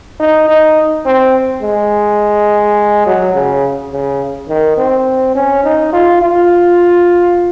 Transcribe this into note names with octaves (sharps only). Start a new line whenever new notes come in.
D#4
D#4
C4
G#3
F#3
C#3
C#3
D#3
C4
C#4
D#4
F4
F4